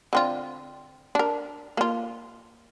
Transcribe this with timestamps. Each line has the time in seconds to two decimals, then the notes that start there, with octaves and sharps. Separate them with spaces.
0.13 D3 C4 F4
1.15 D4 A#4
1.77 A#3 F4